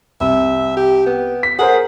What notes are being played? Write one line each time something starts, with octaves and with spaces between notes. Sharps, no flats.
C2 E5
G4
B3
B6
G#4 A#4 C5 F#5